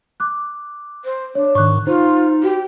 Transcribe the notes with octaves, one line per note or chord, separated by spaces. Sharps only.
D6 F#6
C5
D4 C#5
G#2 D#3 C#6 F#6
D#4 F4 C5
F#4 G4